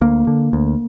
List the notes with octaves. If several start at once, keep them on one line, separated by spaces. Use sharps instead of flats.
D2 A#3
D3
D2